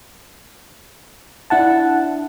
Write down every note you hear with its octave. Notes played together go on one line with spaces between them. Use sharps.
D4 E4 F#5 A5